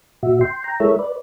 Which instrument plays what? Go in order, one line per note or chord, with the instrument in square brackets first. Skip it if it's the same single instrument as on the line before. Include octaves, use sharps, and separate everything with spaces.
[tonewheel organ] A#2 F#4 E5
G5 C6
G5 A#5
G#3 E4 A4 A#4 C#5 E5
B4 D5